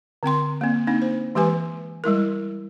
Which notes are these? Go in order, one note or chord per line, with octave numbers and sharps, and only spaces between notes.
D3 C4 G5 C6
A#3 C4
A#3 C4 D4 D#4
C5
E3 G#3 G4 B4 G#5
G3 G#3 E4 A#4